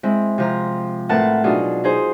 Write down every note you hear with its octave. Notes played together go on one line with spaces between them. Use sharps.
G#3 C4 E4
C3 F3 A#5
A2 C4 A#4 B4 F#5 A5
B2 F#3 D4 D#4 F4 G#4
D#4 G#4 C5